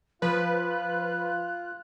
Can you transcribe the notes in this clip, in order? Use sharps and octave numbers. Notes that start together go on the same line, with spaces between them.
F3 F4 B4 F#6